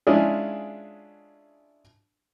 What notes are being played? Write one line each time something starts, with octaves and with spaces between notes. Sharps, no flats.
G#3 C#4 D4 E4 F4 G#4